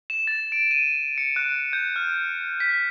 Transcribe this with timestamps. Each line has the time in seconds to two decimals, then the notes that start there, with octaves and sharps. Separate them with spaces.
0.10 E7
0.27 A6
0.52 D7
0.71 D#7
1.18 C#7
1.36 F#6
1.73 G6
1.96 F6
2.60 B6